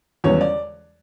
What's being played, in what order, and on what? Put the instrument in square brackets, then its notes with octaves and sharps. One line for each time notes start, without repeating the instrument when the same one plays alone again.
[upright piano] E1 E2 C#3 G3 B3 C#5
D5